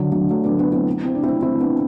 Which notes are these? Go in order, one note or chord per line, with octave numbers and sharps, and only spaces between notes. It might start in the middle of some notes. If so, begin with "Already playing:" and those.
Already playing: D3 F#3
D3 F#3
F#3 A3
B3 D4
B3 D4
C4 E4
C4 E4
D4
C4 E4
C4 E4
B3 D4